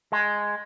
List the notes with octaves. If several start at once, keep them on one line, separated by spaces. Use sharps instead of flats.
G#3